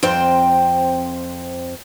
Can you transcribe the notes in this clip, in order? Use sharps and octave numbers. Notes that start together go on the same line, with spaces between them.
F2 C4 C5 G5